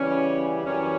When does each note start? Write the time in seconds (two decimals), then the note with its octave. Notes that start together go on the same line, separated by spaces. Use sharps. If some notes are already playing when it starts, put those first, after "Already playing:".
Already playing: C#3 E3 G3 C#4
0.65 F#2 E3 G3 C#4